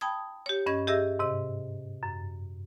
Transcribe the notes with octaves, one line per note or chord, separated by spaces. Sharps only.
G5 A5 B5 D#6 G#6
G4 C#5
G2 C#4 D#5 G#6
G4 G#4 D#5 E5 E6 A#6
G#2 C3 D#5
F#2